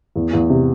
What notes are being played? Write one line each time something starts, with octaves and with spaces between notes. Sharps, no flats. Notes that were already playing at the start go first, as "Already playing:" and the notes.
E2
E2
C3